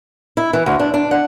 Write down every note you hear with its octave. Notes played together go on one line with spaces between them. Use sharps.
E4
E3
D2
D4
D4
F#5